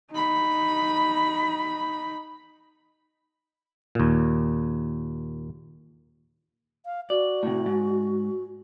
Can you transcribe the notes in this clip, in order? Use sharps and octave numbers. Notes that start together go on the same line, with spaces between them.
D#4 B5
D#2 A#2
F5
F#4 D5
A2 C3
G#2